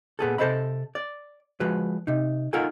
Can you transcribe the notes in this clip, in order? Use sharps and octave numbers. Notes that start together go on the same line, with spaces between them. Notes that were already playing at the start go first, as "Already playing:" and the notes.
A#2 B3 G#4 A4
C3 A4 C5 D#5 E5 B5
D5
F3 G#3 F#4 B4
C3 D#4
D#4 F4 A4 A#4 F#5 G#5